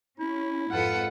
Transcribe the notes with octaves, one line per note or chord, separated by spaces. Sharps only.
C#4 E4
F2 G#2 F4 A4 B4 F#5 C#7